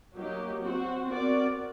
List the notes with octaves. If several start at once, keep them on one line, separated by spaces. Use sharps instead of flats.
F#3 A#3 D#4 G4
C4 F#4 C5
C4 F#4 A#4 D5